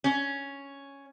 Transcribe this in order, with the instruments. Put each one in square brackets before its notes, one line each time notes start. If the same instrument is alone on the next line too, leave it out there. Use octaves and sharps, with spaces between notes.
[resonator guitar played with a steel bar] C#4